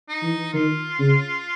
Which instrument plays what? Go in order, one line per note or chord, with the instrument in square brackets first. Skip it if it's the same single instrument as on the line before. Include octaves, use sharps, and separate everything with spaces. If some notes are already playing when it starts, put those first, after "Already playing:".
[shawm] D#4
[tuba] E3
[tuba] D#3 [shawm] F4
[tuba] C#3